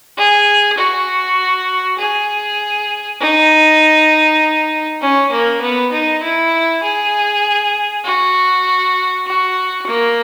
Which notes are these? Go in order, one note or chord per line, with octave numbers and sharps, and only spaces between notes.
G#4
F#4
G#4
D#4
C#4
A#3
B3
D#4
E4
G#4
F#4
F#4
A#3